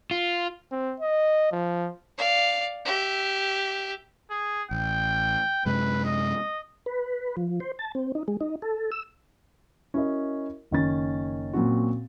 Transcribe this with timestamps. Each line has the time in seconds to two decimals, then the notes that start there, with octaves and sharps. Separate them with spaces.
0.11 F4
0.72 C4
1.00 D#5
1.52 F3
2.18 D5 F5
2.85 G4 E5
4.31 G#4
4.71 A1 G5
5.66 F#2 C3 G#3 B4
6.05 D#5
6.86 B4
7.37 F3
7.60 C5
7.79 A5
7.95 C4
8.15 D#4
8.28 G#3
8.41 D#4
8.62 A4
8.92 E6
9.94 C#4 E4 F#4 A#4 D#5
10.71 F#1 D#3 C#4 A6
11.53 A#2 F#3 C4 C#4 F#4